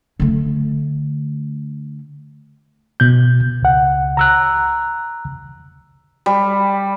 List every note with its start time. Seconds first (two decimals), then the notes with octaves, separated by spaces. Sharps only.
0.20 D3 A3
3.00 B2 G6
3.63 C#2 F#5
4.17 A#5 E6 F#6
6.26 G3